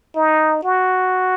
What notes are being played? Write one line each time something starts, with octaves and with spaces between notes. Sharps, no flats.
D#4
F#4